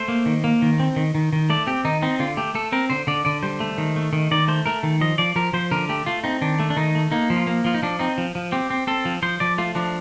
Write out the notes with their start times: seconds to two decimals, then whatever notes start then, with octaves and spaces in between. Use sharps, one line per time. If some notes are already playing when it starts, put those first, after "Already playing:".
Already playing: A3 C5
0.08 A#3
0.26 D#3
0.44 A#3
0.62 D#3
0.80 C4
0.96 D#3
1.15 D#3
1.33 D#3
1.50 A3 D5
1.67 C4 G4
1.85 D#3 D#4
2.02 C4 D#4
2.20 D3 F4
2.37 A3 G4
2.55 A3 A4
2.72 C4 A#4
2.90 D3 C5
3.07 D3 D5
3.25 D3 D5
3.43 G3 C5
3.60 A3
3.78 D#3
3.96 A3
4.13 D#3
4.31 D#3 D5
4.48 A3 C5
4.66 A3 A#4
4.83 D#3
5.01 F3 D#5
5.18 F3 D5
5.36 F3 A#4
5.53 F3 C5
5.71 D3 A#4
5.89 A3 G4
6.06 A3 F4
6.24 C4 D#4
6.42 D#3 D4
6.60 A3
6.70 D4
6.77 D#3 D#4
6.95 A3
7.11 A#3 D#4
7.30 F3
7.36 F4
7.47 A#3
7.64 F3 F4
7.74 D#4
7.82 F3 D4
7.99 C4 D#4
8.18 F3
8.35 F3
8.52 C4 G4
8.70 C4
8.87 C4 A4
9.05 F3
9.22 F3 C5
9.40 F3 D5
9.58 A3 F4
9.75 F3 D4